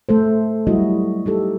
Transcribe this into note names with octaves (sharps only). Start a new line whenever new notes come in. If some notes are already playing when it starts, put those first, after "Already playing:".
A3 A4 C5
F#3 G3 E4 F#4 D#5
D#4 G4 A4